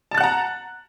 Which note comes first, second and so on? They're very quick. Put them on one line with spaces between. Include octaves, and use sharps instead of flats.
A5 A6 F#6 F#5 A#5